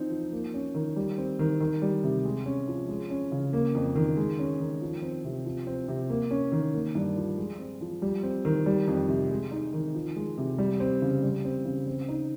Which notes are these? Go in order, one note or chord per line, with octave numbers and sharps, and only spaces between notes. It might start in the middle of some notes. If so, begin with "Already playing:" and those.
Already playing: F3 C4 D#4
F3
A#3
C#4
D#3
G3
C4
D#3
D#3
G3
C3
G#3
C#4
F3
G#3
C#4
C#3
A#3
F2
D#3
G#3
C#4
D#3
F3
C4
C3
F3
C4
C3
A#3
C#4
D#3
A#3
G2
F3
G#3
C4
F3
G3
C4
D#3
G3
F2
C3
G#3
D#4
D#3
F3
G#3
C3
G3
C4
C#3
G3
C4
C#3
C4
D#4